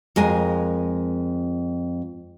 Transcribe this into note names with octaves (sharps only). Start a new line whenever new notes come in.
F2 G#3 A#4 G#5